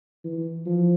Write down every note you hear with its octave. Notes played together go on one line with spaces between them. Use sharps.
E3
F3